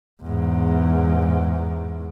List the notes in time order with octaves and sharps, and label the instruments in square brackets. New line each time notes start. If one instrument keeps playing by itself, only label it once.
[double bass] E2 G#2